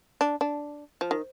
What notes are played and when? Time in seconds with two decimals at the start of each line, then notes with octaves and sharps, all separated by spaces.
0.21 D4
0.41 D4
1.01 F3
1.11 D#3